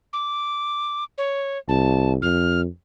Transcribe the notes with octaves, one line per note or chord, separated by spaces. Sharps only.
D6
C#5
C2 A5
F2 F6